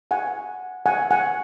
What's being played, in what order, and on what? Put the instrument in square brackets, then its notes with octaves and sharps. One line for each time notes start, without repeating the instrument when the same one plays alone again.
[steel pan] F#5 G#5
F#5 G#5
F#5 G#5